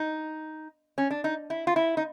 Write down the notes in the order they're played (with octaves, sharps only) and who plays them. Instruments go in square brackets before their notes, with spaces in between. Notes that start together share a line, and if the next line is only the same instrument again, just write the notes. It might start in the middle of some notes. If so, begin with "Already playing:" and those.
Already playing: [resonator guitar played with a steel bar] D#4
C#4
D4
D#4
E4
F4
E4
D#4